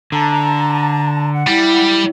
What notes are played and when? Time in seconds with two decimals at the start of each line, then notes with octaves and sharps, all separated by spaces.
0.12 D3 A5 A#5
1.32 F#5
1.47 G3 E4